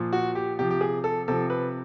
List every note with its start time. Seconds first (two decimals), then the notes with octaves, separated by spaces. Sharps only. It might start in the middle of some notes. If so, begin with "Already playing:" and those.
Already playing: A#2 F3
0.13 F#4
0.35 G4
0.59 C3 F3 G4
0.70 G4
0.81 G#4
1.04 A4
1.28 C3 F3 A4
1.50 B4